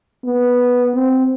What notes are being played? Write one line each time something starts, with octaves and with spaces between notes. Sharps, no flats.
B3
C4